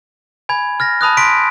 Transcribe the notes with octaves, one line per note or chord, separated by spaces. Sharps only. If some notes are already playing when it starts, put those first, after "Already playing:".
G#5 B5 G#6
F6 A6 A#6
A5 B5 D#6 F#6
C6 B6 D7